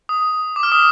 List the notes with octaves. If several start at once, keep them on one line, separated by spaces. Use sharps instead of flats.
D#6
D6
F6
D#6